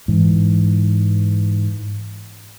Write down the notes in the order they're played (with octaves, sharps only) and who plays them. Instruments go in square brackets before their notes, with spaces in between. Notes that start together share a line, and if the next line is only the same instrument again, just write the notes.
[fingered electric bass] G#2 E3